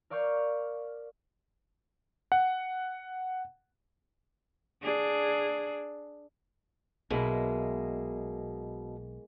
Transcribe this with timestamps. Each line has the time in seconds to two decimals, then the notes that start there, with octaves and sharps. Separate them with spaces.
0.10 A#4 D5 F5 C#6 F6 G6
2.32 F#5
4.83 D4 G#4
7.11 B1 B2 G#3 A#3 E4